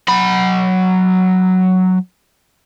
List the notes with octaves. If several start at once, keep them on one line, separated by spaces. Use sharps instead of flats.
F#3 B5